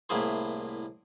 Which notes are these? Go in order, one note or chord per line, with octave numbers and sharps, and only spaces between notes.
C2 A2 A#3 E4 G#4 C5